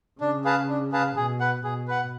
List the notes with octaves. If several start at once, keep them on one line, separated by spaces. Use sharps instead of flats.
C#3 D4
G#4 B4 F5 A5
D4
G#4 B4 F5 A5
B2 G#4
B4 F#5
B2 G#4
B4 F#5